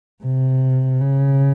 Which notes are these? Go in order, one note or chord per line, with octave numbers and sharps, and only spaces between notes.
C3
C#3